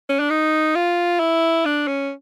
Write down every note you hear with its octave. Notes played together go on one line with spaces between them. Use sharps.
C#4
D4
D#4
F4
E4
D4
C#4